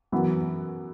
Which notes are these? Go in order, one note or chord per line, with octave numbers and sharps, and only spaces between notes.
F#2 E3 B3